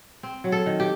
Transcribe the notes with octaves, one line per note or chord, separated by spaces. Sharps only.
C4
F#3
A4
D#3
G4